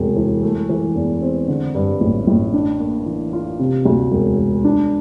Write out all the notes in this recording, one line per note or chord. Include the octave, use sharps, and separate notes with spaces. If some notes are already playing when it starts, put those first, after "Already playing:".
Already playing: E1 D2 C3
E3
A3
E3
E2
C4
D3
G2
A1
A1
D4
A#3
E3
F4
C3
D2
E1
E1
D4